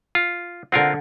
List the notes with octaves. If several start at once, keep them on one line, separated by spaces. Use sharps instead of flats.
F4
D3 C4 F4 A#4 F#5